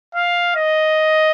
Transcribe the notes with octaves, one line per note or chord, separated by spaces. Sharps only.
F5
D#5